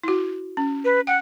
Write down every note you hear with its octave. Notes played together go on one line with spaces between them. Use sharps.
E4 F#4
C#4
B4
F#5 G5